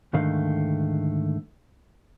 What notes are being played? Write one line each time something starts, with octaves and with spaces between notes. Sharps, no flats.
D2 G#2 D3 D#3 A3 F5